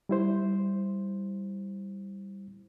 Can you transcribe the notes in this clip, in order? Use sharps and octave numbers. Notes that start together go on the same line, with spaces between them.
G3 E4 C5